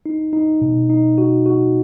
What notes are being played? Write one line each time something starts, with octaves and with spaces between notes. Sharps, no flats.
D#4
D#4
B2
D#4
F#4
F#4